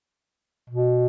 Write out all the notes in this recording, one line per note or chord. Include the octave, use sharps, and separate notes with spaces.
B2